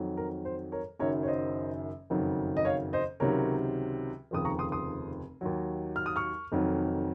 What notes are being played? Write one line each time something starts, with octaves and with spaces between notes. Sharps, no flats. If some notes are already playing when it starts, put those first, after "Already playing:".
Already playing: F2 D#3 F#3
A#4
C5
A#4 C#5
F#1 F#2 D#3 F#3 A#4 C#5
C#5
C5 D#5
F#1 F2 D#3 F#3
D#5
C#5 F5
C5 D#5
C#2 C3 D#3 F#3 A#4 C#5
F1 D#2 C#3 F3 D#6
A#5 C#6
C6 D#6
C6 D#6
D#2 D#3 F#3
F6
D#6
C#6 F6
F1 F2 D#3 F#3